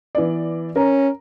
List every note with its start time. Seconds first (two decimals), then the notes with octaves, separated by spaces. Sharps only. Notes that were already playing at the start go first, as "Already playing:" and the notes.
0.15 E3 B3 D5
0.76 C#4 A#4 A#5